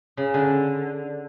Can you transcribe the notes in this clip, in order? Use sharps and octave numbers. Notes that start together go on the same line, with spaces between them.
C#3
D3